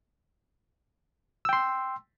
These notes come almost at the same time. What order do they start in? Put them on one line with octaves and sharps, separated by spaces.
E6 G5 C6